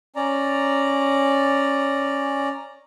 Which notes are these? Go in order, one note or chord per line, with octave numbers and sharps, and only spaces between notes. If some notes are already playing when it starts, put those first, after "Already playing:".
C#4 D5 A#5